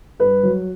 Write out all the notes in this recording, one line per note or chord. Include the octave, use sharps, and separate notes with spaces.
G2 B4
F#3